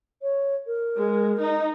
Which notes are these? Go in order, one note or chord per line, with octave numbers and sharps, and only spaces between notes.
C#5
A#4
G#3
D#4